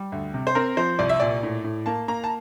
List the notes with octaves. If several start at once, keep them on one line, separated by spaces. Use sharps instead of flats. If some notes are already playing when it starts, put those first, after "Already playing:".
Already playing: G3
D2
C3
C5
C4 A#4
F3 C5
C2 D5
E5
A#2 D5
A2
A2
A#3 A5
A#3 A#5
A5